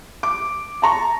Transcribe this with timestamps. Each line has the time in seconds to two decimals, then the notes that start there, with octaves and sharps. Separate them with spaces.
0.23 D6
0.82 A5 A#5 C#6